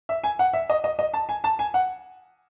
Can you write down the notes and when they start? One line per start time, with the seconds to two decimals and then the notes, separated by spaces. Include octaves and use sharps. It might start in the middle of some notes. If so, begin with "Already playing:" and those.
0.09 E5
0.24 G#5
0.39 F#5
0.53 E5
0.70 D#5
0.84 D#5
0.99 D#5
1.13 A5
1.29 G#5
1.44 A5
1.59 G#5
1.74 F#5